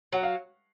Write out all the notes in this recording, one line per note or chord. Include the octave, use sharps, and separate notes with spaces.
F#3 F#5
F5